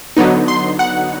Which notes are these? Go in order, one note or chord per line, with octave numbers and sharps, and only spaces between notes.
D3 F#3 B3 D#4
C6
F#5